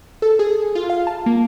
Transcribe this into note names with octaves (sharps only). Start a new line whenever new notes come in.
A4
G#4
F4
F5
A5
A#3